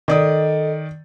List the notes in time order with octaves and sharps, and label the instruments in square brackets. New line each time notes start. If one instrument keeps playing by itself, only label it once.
[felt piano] D#3 D5 D#6 [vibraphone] A4 D#5